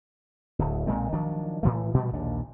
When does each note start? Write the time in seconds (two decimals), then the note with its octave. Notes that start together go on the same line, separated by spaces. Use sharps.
0.59 D1 D2
0.87 B1 A#2 G#3 C4
1.13 D#3 F3 F#3 D4
1.63 A2 E3 A3
1.94 G2 A#2 G3
2.14 A#1 D#2 A#2 D4